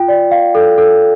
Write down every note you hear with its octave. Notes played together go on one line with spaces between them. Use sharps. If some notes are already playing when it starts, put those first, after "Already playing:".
Already playing: F4 G5
D5
F5
A4
A4